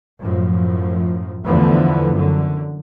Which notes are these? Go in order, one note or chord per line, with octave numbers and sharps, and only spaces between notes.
F#2 A2 F3
E2 D3 E3 F3 A3 B3
F#2 D3